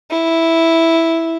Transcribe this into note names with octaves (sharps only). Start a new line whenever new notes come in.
E4